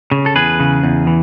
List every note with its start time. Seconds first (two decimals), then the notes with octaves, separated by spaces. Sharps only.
0.11 C#3
0.26 A4
0.35 E2 G#4 B4
0.60 C#3
0.84 E2
1.07 E3